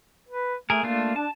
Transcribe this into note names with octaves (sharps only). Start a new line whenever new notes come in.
B4
A3 G#4 A#4
A3 A#3 D4 F4
D4 A5